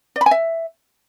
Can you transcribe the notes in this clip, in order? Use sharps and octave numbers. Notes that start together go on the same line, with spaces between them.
D5
B5
G#5
E5